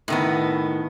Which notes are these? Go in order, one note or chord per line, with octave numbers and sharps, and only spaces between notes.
A2 D#3 B3